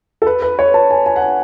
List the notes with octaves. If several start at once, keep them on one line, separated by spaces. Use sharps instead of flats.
A4
B4
B4
C#5
A5
G#5
G#5
F#5
G#5